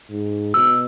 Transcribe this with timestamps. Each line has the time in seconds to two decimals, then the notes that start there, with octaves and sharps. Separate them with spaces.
0.10 G#2
0.54 B2 E6